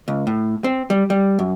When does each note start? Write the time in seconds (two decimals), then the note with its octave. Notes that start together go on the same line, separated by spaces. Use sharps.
0.08 C#2
0.27 A2
0.64 C4
0.90 G3
1.10 G3
1.39 F#2